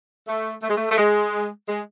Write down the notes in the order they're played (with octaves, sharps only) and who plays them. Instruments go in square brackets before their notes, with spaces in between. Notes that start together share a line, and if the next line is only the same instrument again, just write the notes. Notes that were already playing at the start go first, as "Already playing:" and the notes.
[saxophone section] A3
A3
G#3
A3
A3
G#3
G#3